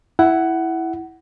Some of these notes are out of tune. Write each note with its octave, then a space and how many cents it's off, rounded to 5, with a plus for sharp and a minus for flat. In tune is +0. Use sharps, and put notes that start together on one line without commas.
E4 +0 F#5 +15